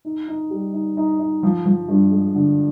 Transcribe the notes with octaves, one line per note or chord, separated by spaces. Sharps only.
D#4
D#4
G3
D#4
D#4
D#4
F3
F3
G2
G#3
D3